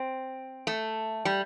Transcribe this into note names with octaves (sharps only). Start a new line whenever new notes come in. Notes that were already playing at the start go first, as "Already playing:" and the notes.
Already playing: C4
A3
G3